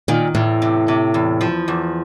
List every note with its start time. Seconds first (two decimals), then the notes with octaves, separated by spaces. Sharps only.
0.08 A#2 D#3
0.35 E2 A2
0.62 C3
0.88 C3
1.14 E2
1.41 F3
1.68 E2